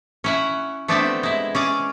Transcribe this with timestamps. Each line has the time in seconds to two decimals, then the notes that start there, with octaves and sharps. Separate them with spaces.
0.24 C#4 E4 F#5
0.88 A3 B3 C4 D4 E4 G4
1.23 G#3 E4
1.55 C#4 G#4 D5